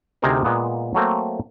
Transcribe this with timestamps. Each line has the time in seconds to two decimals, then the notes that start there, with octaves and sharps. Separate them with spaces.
0.22 D2 C3 D#4 G#4 A#4 C5
0.44 A#2 G#3 A#3 B3
0.94 F#3 A3 A#3 C4